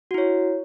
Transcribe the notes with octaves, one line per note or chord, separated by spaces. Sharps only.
E4 F#4 C#5